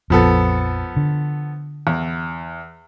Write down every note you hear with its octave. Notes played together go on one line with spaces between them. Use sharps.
A#1 F2 F3 B3 A4
D3
E2